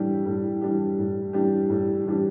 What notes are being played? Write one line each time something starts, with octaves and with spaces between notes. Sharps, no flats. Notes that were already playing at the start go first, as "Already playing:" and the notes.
Already playing: A2 E3 G3 D4 G4
A2
E3 G3 D4 G4
A2
E3 G3 D4 G4
A2
E3 G3 D4 G4